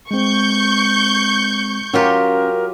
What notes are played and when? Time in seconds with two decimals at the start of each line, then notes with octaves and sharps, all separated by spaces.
0.11 G#3 C4 C#6 G6
1.94 F#3 C#4 F4 G4 A#4